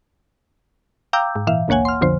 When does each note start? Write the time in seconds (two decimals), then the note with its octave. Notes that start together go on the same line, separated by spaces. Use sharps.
1.13 F5 G5 A#5 D6 E6 G6
1.36 G#2
1.47 A#2 E3 E5 F5
1.68 G#1 D2 A#3 C#5 F#5 G#5
1.85 C6 F6
2.01 B1 F2 D3 F3 C5